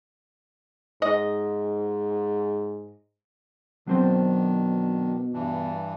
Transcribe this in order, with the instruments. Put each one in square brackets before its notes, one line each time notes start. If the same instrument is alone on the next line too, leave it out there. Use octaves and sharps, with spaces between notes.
[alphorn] G#2 [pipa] D#5
[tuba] B2 [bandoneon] D#3 D4 [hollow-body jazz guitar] F#3 C4 C5
[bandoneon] G2 E3 D4